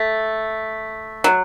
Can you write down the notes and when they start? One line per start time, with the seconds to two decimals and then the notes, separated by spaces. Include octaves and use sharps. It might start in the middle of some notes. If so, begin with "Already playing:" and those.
Already playing: A3
1.24 F#3